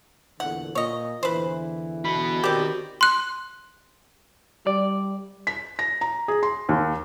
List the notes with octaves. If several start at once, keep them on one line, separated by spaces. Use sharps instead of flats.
E2 A#2 D3 F#5
A#2 C#5 D#5
E2 D3 E3 B4 C5
F#4 B5
D#3 C4 G4 D5
C6 F#6
G3 D5
B6
A#6
A#5
G#4
C6
D#2